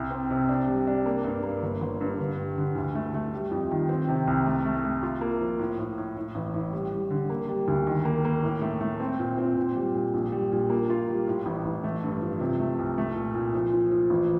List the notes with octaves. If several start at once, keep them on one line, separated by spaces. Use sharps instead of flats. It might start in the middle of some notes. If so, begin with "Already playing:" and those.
Already playing: C2
C4
C3
D4
G3
D4
A#3
G2
A#3
G1
G1
G2
D3
G3
D3
D2
A3
A3
G3
F2
D#3
C4
C3
C2
A3
A3
A3
F4
A#3
F3
A2
A2
A2
A2
A1
A2
G3
G3
D3
A#3
G3
D2
D#3
A#3
A#3
A2
A3
A3
C4
A#2
C4
A#2
G3
A#2
A#1
G3
A#2
A#3
F4
G3
A2
A1
A1
A3
G2
F3
C3
A3
C2
A3
A#2
A#2
F3
F3
F3
A1